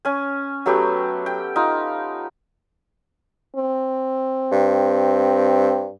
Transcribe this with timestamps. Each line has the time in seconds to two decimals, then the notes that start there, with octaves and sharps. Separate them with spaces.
0.05 C#4 G#5
0.66 F#3 A3 B3 G4
1.26 G5
1.56 D#4 F4
3.56 C4
4.52 G2